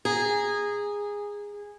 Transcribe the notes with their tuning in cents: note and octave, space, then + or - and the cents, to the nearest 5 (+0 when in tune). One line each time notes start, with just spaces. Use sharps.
G#4 -15 A#5 +0